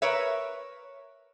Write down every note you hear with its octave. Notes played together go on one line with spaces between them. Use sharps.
A#4 B4 C#5 E5